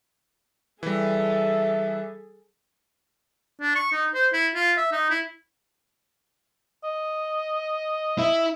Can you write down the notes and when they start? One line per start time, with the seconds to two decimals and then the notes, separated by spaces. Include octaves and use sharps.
0.83 E3 G3 G#4 A4 E5
3.60 D4
3.75 C#6
3.92 D#4
4.14 C5
4.33 E4
4.55 F4
4.77 E5
4.92 D#4
5.10 E4
6.84 D#5
8.18 E4